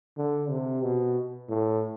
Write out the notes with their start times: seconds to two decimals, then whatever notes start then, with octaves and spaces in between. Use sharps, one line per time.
0.17 D3
0.50 C3
0.83 B2
1.49 A2